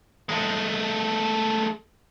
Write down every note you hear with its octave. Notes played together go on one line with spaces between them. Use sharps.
G#3 A3